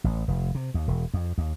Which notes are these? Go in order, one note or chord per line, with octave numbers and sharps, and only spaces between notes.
A1
F1
C3
D#2
E1
F2
D#2